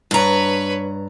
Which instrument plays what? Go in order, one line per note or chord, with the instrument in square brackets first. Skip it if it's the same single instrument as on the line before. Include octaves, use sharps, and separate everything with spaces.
[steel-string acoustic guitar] G2 A#5 [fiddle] B4 C#5